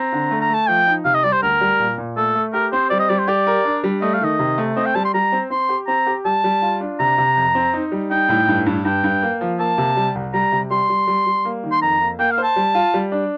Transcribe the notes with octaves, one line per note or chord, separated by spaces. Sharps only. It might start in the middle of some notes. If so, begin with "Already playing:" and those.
Already playing: C4 A#5
D3
A3
A#5
A3 A5
F3 G5
D#4
C3 F5
D#5
G3 D5
C5
D2 A#4
G3
A#2
A#2
A3 A4
A3
G4 A#4
C4 C5
G3 D5
D#5
G3 D5
C5
G4 D5
A#4
D4
G3
A3 D#5
F5
D#3 D#5
C3
A3
C4 D#5
G5
G3 A5
C6
G3 A#5
C4
C4 C6
G4
C4 A#5
G4
G3 A5
G3
F4
D4
C3 A#5
C3
F2
C4
D#4
G3
D#4 G5
A2
G2
G2
G2 G5
G2
A#3
F3
A#3 A5
C3
G3
C2
G3 A#5
C3
G3 C6
G3
G3
G3
A#3
D#3
C6
F2 A#5
A#3
A#3 G5
F5
C5
A5
G3
F4
G3
D4